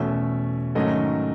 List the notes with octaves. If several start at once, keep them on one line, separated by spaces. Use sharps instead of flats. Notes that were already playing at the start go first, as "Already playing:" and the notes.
Already playing: E2 B2 A3 C#4 E5
G#2 D#3 F#3 A3 C#4 D#5